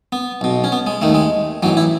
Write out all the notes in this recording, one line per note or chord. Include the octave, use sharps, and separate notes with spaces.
B3
B1 B2
C#4
B3
G#3
D#2 D#3 A3
G#3
A1 A2 E3 F#3
E4